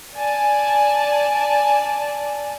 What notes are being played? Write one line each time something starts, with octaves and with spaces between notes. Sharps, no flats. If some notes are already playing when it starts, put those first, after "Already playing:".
D5 G#5 A5